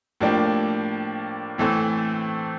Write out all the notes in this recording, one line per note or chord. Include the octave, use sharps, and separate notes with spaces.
A2 F3 A#3 D4 G4
A2 E3 A3 C4